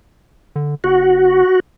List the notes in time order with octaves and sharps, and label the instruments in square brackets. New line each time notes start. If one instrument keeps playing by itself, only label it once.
[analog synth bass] D3
[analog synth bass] F#1 [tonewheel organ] F#4